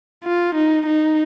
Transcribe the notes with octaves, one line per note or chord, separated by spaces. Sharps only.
F4
D#4
D#4